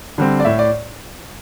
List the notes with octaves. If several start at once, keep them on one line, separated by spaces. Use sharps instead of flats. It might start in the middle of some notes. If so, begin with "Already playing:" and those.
D3 G3 C4
D5
A2 E5
D5